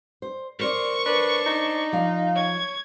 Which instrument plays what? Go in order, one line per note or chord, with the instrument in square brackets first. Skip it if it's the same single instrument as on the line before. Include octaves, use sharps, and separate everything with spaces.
[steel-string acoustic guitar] C5
[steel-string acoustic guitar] A#4 C5 D5 [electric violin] C#6
[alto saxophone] D4 [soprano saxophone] B4
[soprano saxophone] D#4
[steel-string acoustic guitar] F3 F5
[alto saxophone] C#5 [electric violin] G#6